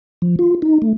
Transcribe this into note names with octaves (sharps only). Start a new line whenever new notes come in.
F3
F4
D#4
A3